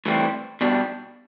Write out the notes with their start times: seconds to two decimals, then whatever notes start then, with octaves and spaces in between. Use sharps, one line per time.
0.06 A2 E3 G3 C4
0.61 B2 G3 D4